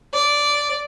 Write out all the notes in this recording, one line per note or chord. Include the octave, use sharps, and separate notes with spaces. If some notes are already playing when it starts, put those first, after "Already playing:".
D5